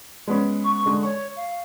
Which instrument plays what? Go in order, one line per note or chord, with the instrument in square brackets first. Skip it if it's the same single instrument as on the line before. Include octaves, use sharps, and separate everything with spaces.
[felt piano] G#3 B3 C#4
[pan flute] C#6
[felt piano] D3 G#3
[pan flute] C#5 [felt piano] C#6
[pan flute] F5